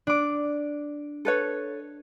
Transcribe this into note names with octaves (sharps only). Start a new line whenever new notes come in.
D4 D6
A4 B4 C#5